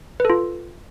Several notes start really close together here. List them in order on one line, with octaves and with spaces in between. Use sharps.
B4 A4 F4